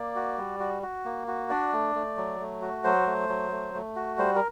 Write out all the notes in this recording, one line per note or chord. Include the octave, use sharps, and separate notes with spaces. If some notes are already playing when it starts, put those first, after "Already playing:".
Already playing: A#3 D5
F#4
G3
F#4
F#4
A#3
F#4
D4 D5
A3
A3
F#3
A3
F#4
F#3 C5
A3
F#3
A3
A3
F#4
G3 C5
A#4